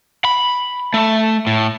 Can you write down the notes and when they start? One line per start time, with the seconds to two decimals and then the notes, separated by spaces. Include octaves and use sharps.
0.25 B5
0.94 A3
1.47 A2